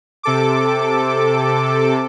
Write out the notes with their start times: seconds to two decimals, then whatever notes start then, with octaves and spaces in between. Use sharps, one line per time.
0.23 C3 A4 D6